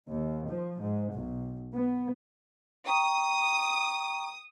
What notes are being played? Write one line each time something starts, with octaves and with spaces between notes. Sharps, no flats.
D#2
F3
G#2
B1
B3
G5 A#5 C#6 D#6